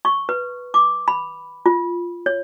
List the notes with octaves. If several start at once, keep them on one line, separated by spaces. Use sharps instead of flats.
C#6
B4
D6
B5
F4
C#5